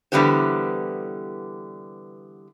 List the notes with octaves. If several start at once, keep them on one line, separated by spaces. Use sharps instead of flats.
D3 E3 G3 B3 G4 C5